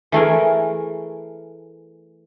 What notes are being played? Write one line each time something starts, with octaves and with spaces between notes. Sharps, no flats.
E3 A3 G#4 A#4